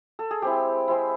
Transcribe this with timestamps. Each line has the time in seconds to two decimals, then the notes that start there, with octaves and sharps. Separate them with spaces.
0.19 A4
0.31 G#4
0.42 G#3 C4 E4 G4
0.88 G#3 C4 E4